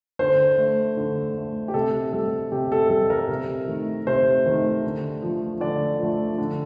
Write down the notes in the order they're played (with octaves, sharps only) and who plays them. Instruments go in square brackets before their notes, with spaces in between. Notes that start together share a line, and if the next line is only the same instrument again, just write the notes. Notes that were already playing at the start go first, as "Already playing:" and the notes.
[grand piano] D3 C5
A3
D3
A3
G4
C3 A4
G3 A4
C3 G4
A4
G3 A4
A#4
C3
D#3 A3
C3 C5
D#3 A3
D3
F3 A3
D3 D5
F3 A3
D3